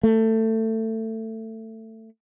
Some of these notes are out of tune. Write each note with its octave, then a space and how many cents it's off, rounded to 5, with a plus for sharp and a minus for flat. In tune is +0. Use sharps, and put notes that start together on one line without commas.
A3 +20